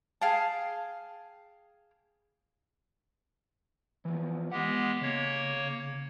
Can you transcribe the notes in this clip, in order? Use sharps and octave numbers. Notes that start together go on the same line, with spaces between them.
G#4 F5 G5 A5
E3 F3 B3
G#3 B3 G4 F#5
C#3 A#3 C#5